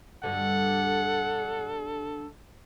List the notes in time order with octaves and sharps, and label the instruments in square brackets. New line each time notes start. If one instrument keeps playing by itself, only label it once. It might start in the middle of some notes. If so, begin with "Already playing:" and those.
[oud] G2 B2 D3 [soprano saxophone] A4 [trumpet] F#5